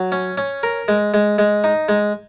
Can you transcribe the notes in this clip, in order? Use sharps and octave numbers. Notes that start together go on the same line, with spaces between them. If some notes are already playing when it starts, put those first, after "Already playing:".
Already playing: F#3
C#4
C#4
A#4
G#3
G#3
G#3
D#4
G#3